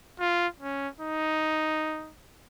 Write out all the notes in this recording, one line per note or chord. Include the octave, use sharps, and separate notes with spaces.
F4
C#4
D#4